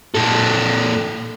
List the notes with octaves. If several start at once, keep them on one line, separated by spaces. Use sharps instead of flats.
A#2 A4